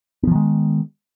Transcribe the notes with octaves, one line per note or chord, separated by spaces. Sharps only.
D#3 F3 G#3 B3